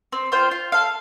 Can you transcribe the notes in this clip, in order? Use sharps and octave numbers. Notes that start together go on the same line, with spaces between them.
C4
F4 C5 G5
F4
A4 F5